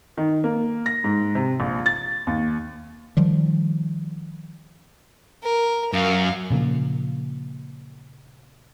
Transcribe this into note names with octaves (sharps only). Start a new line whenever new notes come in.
D#3
A#3
A#6
G#2
C3
A#1
A6
D#2
D#3 F3 G3
A#4
F#2 F5
A#2 C#3 F3 A#3